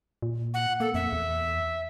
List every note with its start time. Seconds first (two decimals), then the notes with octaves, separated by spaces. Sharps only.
0.22 A#2
0.54 F#5
0.80 A#3 A4
0.94 F2 E5
1.13 E2